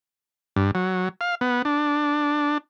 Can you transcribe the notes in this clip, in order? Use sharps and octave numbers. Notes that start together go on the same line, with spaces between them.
G2
F#3
F5
B3
D4